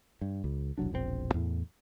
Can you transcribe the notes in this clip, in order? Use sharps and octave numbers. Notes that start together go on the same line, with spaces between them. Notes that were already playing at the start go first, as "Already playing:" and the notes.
G2
C#2
E1 C2 F#3 D4
E1 A#1 B2 C4
E2 A2